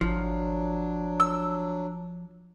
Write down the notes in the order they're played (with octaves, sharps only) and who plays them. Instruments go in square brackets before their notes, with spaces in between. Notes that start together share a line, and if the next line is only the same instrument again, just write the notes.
[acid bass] G#1 [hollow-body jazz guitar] F3 [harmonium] F#3 D4
[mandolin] E6